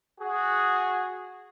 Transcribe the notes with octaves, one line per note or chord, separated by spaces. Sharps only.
F#4 G#4